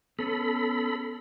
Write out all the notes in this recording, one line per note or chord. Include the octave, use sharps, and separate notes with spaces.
B3 C#4 A4 B5